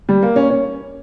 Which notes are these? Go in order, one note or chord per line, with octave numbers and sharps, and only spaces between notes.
G3
A#3
C#4
C#4